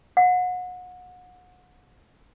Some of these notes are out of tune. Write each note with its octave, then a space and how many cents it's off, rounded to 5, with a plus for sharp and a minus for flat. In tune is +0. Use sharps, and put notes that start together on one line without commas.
F#5 -30